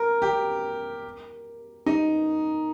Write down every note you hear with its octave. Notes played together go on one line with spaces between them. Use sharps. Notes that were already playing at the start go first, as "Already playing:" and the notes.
Already playing: A#4
G4
D#4